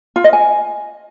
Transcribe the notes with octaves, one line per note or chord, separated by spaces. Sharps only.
F4
D#5
G#5